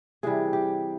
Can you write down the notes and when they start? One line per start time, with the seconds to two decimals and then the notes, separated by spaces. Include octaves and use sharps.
0.23 C3 E3 G3 G#4
0.53 G4